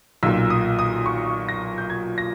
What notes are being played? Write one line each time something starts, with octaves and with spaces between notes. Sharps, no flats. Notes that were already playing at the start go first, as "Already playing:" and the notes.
B1 A#2 E6
D#6
D#6
C#6
A#6
G6
G#6
A#6